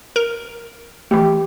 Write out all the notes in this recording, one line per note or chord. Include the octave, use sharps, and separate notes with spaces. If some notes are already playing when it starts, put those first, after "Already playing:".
A#4
E3 A3 G4